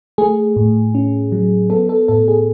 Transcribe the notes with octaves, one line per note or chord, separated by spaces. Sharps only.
A3 G#4
A2
C#4
F#3
B3 A4
A4
A2 A4
G#4